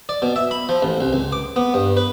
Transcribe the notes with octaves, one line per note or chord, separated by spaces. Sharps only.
D5
B2
E5
B5
F3
A1
C2
C#2
D6
B3
G2
B4